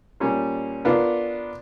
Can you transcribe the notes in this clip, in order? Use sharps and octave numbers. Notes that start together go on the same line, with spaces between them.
A#2 G3 A#3 C#4
B3 D4 F4 A#4